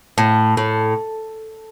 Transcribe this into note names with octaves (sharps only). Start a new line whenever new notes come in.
A2
A2